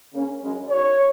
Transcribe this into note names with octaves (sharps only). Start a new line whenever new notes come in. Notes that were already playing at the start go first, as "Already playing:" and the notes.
C#3 A#3 C#4
F#2 C#3 G#3 C#4
F#2 F#3 D#4 C#5